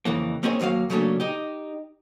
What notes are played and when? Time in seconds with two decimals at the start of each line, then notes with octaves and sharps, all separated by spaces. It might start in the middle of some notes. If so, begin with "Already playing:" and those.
0.05 F2 C#3 E3 A#3
0.43 A#3 C4 C#4 D#4 G#4 C#5
0.60 D#2 F#3 A#3 D5 F5
0.90 C#3 F#3 A3 A#3 C#4 D4
1.20 D#4 G4